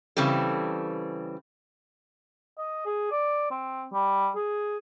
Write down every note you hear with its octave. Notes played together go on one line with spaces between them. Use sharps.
C#3 E3 G3 C4 A4
D#5
G#4
D5
C4
G3
G#4